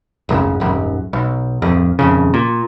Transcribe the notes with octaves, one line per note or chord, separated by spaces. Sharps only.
D1 G#1 F#2 C#3
D#1 G#1 F#2
B1
D1 F2
D#1 F2 C#3
A#2